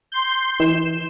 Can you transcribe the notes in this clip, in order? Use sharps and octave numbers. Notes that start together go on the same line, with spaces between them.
C6 G6
E3 E7